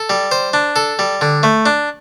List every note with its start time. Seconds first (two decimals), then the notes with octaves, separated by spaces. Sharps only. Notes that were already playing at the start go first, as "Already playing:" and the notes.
Already playing: A4
0.10 G3
0.31 C5
0.53 D4
0.76 A4
0.99 G3
1.21 D3
1.43 A3
1.66 D4